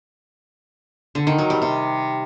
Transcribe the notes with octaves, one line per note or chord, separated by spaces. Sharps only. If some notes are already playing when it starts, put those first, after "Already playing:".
D3
D#3
F#3
G3
C3